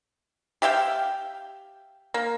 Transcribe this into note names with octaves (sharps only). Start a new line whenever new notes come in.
G4 E5 F5 G5
A#3